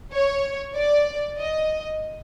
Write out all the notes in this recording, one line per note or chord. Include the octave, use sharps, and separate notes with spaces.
C#5
D5
D#5